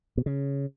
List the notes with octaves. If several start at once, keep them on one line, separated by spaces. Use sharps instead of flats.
B2
C#3